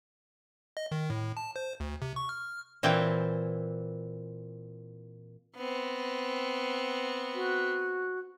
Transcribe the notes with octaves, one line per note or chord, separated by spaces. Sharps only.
D#5
D#3
A2
A5
C5
D2
C3
C#6
F6
A#2 E3 C4 E4 G5
B3 C4
F#4